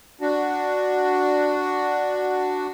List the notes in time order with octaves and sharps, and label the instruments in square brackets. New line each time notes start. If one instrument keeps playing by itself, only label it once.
[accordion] D4 F#4